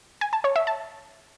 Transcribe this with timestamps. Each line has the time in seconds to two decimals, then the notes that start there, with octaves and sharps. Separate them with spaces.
0.21 G#5
0.33 A5
0.44 C#5
0.56 E5
0.67 A5